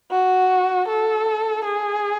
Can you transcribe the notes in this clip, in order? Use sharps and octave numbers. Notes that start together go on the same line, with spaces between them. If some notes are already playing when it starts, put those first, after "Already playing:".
F#4
A4
G#4